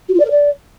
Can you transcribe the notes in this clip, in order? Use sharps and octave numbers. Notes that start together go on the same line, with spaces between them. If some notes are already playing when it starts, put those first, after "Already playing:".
F#4
F4
D5
A#4
D5